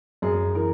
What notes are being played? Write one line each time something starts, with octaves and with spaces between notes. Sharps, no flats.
F#2 G#4
E3 A#4